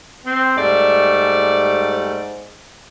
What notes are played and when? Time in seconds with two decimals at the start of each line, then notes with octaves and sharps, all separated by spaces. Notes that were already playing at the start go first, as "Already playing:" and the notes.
0.25 C4
0.57 G#2 G3 A3 D5